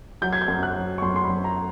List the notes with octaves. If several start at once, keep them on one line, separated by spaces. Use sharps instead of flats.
F#3 G6
G#6
G6
F#2
F#6
F#3
C#6
F#2 C6
C6
B5
F#2
A#5